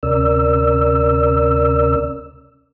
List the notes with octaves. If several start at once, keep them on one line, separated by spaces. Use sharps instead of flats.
D2 C3 C#4 A#4 D5 E6